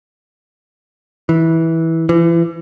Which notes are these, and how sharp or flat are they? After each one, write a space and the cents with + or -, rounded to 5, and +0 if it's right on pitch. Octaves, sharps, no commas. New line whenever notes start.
E3 -15
E3 +35